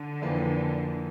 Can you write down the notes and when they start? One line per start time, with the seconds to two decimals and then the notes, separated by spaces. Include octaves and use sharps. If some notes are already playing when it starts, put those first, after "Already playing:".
Already playing: D3
0.22 F2 E3 A#3